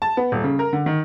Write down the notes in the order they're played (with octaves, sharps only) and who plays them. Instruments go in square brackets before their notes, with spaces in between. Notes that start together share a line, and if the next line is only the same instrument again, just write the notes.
[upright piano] A5
B3
D#1
C#3
A#4
D3
D#3